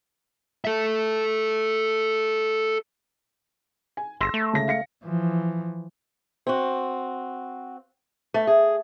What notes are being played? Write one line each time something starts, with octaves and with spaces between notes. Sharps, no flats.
A4 E5
G#5
G1 C6 E6 A#6
A3
C#2 C#3 A#6
F5 A#6 C#7
E3 F3
C4 F#4
A3
G#4